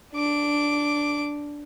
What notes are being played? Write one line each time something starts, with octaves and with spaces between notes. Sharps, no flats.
D4 D6